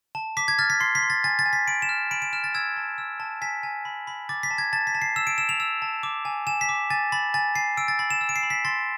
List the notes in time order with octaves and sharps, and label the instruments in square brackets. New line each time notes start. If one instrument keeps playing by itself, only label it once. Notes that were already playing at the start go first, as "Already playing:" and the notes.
[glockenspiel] A5
D6 B6
G#6
F6 A6
B6
C6 C7
B6
C6
A6
G#5 A6
A6
G#5
B6
B5 D7
E7
F6
B5 D7
D7
F6 E7
A6
E6 G#6
A5
E6
A5
G#5 B6
G#5
B5
B5
D6 A6
B6
A5
G#6
A5 A6
B6
A5
C7
E6 E7
D7
E6 E7
F7
E6
A5
D6
G#5
G#5 E7
B6
D6
G#5 A6
B5 A6
G#5 A6
G#5 C7
E6 D7
A6
B5 A6
E7
E6
D7
C7
B5
B6
C6 A6